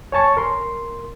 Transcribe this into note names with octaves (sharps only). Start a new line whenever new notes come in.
C#5 G#5 A5 C#6
A#4 C6